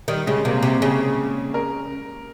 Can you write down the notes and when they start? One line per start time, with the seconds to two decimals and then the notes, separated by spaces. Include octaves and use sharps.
0.08 D#3 G3
0.27 C#3 G#3
0.45 C3 A#3
0.63 C3 G4
0.82 C#3 G#4
1.54 A#4